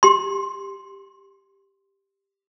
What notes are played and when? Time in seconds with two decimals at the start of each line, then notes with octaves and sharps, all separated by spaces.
0.03 G4 C6